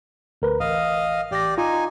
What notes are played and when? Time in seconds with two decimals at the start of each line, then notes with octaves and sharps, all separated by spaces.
0.42 D2 A#4 B4
0.60 A1 D#5 F5
1.32 A1 G4 D5 A#6
1.58 D#4 F4 G#5